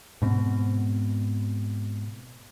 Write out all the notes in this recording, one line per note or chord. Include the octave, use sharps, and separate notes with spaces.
G#2 B2 C4